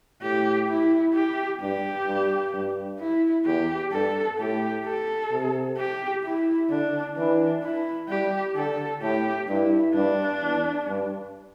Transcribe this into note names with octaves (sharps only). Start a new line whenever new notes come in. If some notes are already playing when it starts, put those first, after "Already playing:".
A2 G4
E4
G4
G2 G4
G2
G2
E4
E2 G4
G2 A4
A2 G4
A4
C3
G4
E4
D3 D4
E3 D4
E4
G3 G4
D3 A4
A2 G4
G2 E4
G2 D4
E2
G2